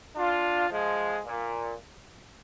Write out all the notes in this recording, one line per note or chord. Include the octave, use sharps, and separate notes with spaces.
D4 F4
F3 G#3
A#2